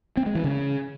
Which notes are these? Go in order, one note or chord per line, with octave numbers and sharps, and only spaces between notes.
C4
G#3
E3
C#3